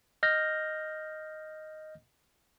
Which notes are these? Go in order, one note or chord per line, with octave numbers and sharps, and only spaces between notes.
D#5 F6 G6 A#6